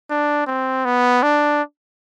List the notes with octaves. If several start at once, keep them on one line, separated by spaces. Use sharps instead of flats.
D4
C4
B3
D4